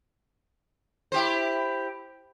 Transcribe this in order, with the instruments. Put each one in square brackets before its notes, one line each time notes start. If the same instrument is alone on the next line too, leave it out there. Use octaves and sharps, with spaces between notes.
[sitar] E4 G4 C5